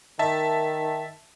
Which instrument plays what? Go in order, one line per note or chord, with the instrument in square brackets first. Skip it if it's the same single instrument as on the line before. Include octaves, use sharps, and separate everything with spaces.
[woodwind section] D#3 [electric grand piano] E5 A5